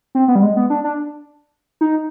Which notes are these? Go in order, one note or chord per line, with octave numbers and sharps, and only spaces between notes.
C4
B3
G3
G#3
B3
D4
D4
D#4